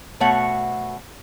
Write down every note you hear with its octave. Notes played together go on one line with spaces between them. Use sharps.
B2 A3 F#4 C#5 F#5